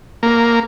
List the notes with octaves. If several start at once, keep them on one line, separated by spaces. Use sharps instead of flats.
A#3